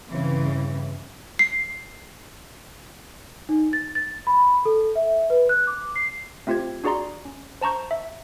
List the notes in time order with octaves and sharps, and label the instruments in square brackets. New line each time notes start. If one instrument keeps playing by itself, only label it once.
[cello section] G2 C#3 E3 C4
[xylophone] C7
[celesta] D#4
A6
A6
B5
A4
E5
B4
F#6
D6
C7
[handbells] A3 C4 F4 G4 C5 G#6
D4 F#4 G#4 D5 A#5 C6
C#4
C5 A5 A#5 C#6 G6
E5